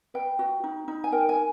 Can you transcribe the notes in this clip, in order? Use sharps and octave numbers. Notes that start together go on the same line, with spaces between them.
B4 G5
F#4
D#4
D#4
G#5
A#4 G5
G#5